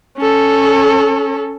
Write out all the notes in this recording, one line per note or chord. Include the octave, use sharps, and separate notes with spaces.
C#4 A4